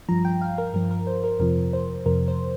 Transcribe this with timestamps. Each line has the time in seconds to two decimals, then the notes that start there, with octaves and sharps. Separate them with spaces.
0.09 G2 F3 A#5
0.25 G5
0.41 F5
0.58 A#4
0.74 G2 F3 A#4
0.91 A#4
1.07 C5
1.24 A#4
1.40 F2 C3 F3 A#4
1.73 C5
2.06 F2 C3 F3 A#4
2.28 C5